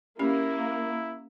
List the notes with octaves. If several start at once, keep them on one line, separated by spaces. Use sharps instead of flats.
A#3 C#4 E4 G4